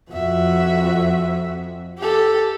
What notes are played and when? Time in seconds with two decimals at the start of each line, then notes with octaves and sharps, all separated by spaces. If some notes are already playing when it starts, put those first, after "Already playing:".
0.12 F2 F#4 E5
1.98 G4 A4